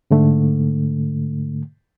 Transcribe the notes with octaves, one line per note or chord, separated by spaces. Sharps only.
G#2 D3 A3